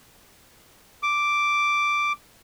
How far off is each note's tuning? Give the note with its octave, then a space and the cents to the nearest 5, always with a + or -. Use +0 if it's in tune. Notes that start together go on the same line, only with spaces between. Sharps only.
D6 +0